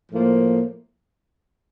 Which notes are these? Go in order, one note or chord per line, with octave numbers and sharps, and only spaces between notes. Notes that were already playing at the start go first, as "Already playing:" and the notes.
A2 F3 A#3